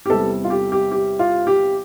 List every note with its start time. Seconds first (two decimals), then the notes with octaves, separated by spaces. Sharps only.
0.06 G4
0.09 E2 C3 G3 A4
0.44 F4
0.50 G4
0.72 G4
0.92 G4
1.19 F4
1.47 G4